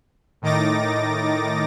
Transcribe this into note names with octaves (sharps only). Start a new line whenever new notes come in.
A2 D#3 D#4 D6 A6 A#6